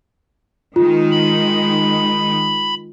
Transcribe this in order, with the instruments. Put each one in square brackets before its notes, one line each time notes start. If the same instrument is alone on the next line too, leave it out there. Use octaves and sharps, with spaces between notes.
[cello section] D#3 G#3 D#4 [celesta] F4
[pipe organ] B5